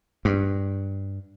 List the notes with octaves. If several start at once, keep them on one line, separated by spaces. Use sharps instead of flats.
G2